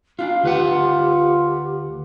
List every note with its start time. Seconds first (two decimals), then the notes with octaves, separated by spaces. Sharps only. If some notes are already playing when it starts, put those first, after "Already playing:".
0.19 D4 F4 F5
0.43 D2 F4 G4 B4 F#5